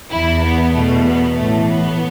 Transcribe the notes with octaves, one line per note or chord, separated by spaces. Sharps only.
E2 E3 E4
B3
E2 B2 A3
B3
A1 A2 E3 A3
B3